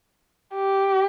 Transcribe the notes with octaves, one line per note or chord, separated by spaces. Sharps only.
G4